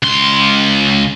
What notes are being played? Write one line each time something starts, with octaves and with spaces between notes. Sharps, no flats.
C#2 C6